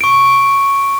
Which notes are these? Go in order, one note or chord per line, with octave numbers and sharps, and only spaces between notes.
C#6 D7